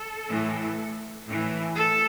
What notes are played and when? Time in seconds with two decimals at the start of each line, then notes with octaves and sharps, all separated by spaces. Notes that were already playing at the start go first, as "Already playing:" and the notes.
Already playing: A4
0.29 A2 E3
1.28 A2 E3
1.77 A4